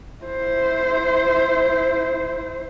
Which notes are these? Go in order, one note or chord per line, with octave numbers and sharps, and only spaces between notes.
E4 C5